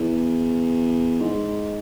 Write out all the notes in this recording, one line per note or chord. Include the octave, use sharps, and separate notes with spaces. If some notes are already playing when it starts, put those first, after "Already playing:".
Already playing: E2
G#2